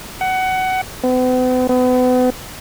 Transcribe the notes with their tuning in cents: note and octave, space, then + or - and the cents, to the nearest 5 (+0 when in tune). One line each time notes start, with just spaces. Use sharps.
F#5 +20
B3 +45
B3 +35